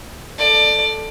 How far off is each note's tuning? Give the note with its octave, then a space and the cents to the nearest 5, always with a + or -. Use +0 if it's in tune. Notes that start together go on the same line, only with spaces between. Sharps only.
A4 +0 D5 +20